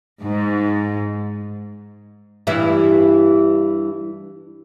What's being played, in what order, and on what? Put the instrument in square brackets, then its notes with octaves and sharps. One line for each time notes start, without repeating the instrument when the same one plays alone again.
[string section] G#2
[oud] G2 E3 E4